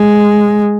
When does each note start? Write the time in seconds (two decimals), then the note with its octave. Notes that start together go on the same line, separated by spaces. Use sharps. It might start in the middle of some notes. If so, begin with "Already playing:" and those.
Already playing: G#3